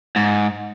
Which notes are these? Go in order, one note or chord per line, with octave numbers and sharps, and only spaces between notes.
G#2